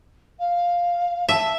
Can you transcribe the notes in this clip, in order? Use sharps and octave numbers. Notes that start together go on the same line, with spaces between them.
F5
E5 A5